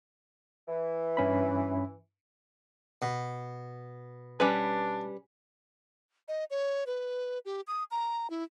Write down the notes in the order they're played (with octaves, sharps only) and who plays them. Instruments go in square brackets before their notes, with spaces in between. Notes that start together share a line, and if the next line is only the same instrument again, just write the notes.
[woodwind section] E3
[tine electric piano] G2 C#4 B5
[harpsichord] B2
[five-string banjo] G3 C#4 B4 [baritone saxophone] D4
[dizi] D#5
C#5
B4
G4
D#6
A#5
E4